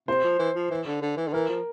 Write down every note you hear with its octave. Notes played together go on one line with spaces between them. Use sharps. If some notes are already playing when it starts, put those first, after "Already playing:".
C3 C5
F3
E3
F3
E3
D3
D3
E3
D3
E3 A#4
F3